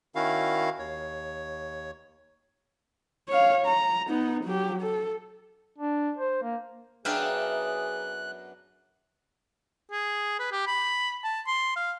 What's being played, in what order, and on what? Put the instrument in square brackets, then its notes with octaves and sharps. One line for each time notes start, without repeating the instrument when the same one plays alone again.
[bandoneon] D#3 C#4 E4 F#4 F5
D#2 C#5
[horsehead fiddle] C#5 F5
A#5
B3 D#4
F#3 G4
A4
[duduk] D4
C5
A#3
[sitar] F#2 B3 D4 [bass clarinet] G#4 [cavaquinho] E5 F5 G5 [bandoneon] F#6
[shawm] G#4
B4
G4
B5
A5
C6
F5